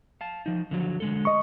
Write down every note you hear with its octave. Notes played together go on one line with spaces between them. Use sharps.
F5 A5
F3 D#4
D3 F3 F#3
D3 G#3 A4
D#5 C#6